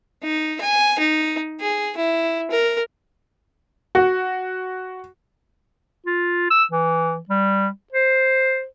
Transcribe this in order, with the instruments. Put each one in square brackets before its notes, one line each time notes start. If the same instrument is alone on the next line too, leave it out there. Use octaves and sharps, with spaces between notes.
[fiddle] D#4
G#5
D#4
G#4
E4
A#4
[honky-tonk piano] F#4
[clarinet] F4
E6
E3
G3
C5